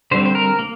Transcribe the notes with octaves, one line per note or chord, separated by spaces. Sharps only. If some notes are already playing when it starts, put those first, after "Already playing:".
D3 G3 C4 C5
C5
A#4
A#3